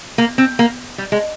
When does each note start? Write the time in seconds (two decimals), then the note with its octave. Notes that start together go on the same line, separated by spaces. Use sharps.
0.18 A#3
0.38 C4
0.59 A#3
0.98 G3
1.12 G#3